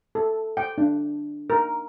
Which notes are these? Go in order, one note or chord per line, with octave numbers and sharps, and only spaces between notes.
A4
G5
D4
A#4